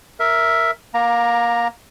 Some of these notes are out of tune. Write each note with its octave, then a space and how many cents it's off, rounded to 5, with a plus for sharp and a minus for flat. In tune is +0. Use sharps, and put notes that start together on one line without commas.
A#4 +0 E5 +0
A#3 +25 A#5 +0